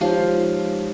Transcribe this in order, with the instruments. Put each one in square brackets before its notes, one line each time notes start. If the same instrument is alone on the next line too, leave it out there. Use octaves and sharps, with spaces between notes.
[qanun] F3 F4 [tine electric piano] G#3 D#4 G4 C#5 F5